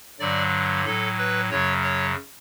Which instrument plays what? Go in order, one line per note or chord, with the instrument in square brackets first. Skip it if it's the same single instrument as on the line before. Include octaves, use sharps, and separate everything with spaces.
[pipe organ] G2 D3 F#3 D5
A2 F#3 A4
B4
F#2 C#3 F#3 C#5
C#5